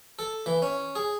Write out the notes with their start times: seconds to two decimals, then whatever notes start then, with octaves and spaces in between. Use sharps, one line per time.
0.19 A4
0.46 E3
0.62 C#4
0.95 G#4